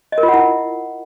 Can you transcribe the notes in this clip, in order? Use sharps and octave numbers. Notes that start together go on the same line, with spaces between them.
D#5
A#4
F4
F#5
E4